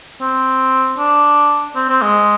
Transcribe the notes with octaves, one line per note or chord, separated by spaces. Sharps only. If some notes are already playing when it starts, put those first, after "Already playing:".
C4
D4
C4
C4
G#3